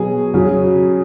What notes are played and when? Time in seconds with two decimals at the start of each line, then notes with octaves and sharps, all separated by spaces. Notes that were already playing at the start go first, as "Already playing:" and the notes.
Already playing: B2 F#3 G#4
0.34 C#3 F#3